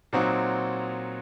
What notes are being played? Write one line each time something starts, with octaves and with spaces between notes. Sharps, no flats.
A#2 F#3 C4 D#4 F#4